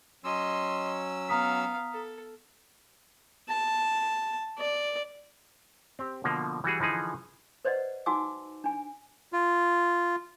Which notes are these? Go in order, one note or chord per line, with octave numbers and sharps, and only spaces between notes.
F#3 C#4 D#5 C6 E6
B3 F5 A#5 D#6 B6
A4
A5
D5
C4 G4
B2 D3 F3 A#3
E3 G3 F#4 G#4
D3 E3 F3 D#4 G#4
B4 C5 D5 D#5 F#5
D#4 F#4 F#5 G#5 D6 E6
D4 G#5
F4